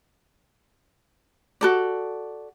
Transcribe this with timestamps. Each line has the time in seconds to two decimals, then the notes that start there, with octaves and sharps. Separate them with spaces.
1.61 F#4 A4 D5